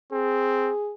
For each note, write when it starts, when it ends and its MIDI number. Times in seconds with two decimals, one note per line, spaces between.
0.12 0.71 60
0.12 0.94 68